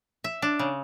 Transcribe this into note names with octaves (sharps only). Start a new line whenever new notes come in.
E5
D4
C#3